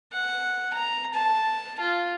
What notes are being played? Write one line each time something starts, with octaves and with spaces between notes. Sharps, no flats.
F#5
A#5
A5
F4